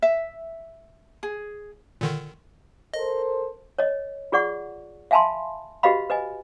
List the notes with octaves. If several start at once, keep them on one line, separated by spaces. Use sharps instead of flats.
E5
G#4
A#2 D3 D#3
A4 A#4 C5 D#5
C#5 D#5
F4 G#4 D5 F#5 C#6
E5 F5 G#5 A5 B5 C6
F#4 G4 B4 D#5 F5 B5
B4 D#5 G#5